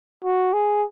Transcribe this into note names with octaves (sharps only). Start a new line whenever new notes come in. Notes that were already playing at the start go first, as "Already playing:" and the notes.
F#4
G#4